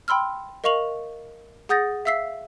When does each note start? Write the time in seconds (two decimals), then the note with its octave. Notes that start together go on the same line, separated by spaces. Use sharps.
0.08 G5 B5 C6 E6 F6
0.64 A#4 D#5 F5 C#6 F7 F#7
1.69 G#4 F#5 D#6 G6 A6 A#6
2.05 E5 F5 E6 B6 C7